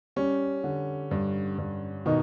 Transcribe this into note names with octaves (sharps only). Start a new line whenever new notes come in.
G3 C#4
D3
G2
G2
B2 D#3 D#4